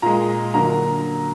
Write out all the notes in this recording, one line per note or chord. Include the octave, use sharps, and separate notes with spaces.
A#2 G#3 A#5
D3 F#3 A#3 A#5